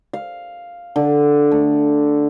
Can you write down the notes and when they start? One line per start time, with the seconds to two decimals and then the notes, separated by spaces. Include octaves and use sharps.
0.13 F5
0.96 D3
1.52 A3